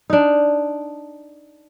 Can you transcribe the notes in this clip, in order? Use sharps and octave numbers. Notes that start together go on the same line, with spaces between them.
D4 D#4